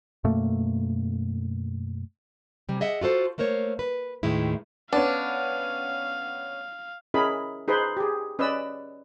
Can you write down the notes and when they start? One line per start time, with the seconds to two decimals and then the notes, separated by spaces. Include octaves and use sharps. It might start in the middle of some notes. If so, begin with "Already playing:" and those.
0.24 F#2 B2 A3 A#3
2.69 C3 G3
2.80 G#4 D#5 E5 F#5
3.01 F4 F#4 A4 C5
3.38 A3 A#3 A#4 C5 C#5
3.79 B4
4.23 D#2 A2 D#3 G#3 E4
4.93 B3 C#4 D4 F5
7.14 C#4 E4 G#4 A#4 D#5 B5
7.68 D#4 G#4 B4 C5 C6
7.97 G4 G#4
8.39 C#4 B4 D5 D#5 E6